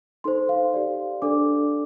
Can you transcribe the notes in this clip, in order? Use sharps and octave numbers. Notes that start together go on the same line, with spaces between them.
D#4 A4 C5 C6
F5
G4 D5
D4 A4 D5 D6